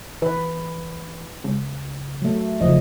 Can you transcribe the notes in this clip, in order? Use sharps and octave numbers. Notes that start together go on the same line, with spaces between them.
E3 B4
C#2
F#3 A3
F#1 C#3 F3 D#5